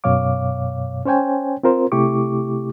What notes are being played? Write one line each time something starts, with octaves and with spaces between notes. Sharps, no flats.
F#2 B2 C#5 F5 D6
C#4 C5 C#5 G5 G#5
C4 F4 A#4 C5
C3 A3 E4 G4 C#6 D6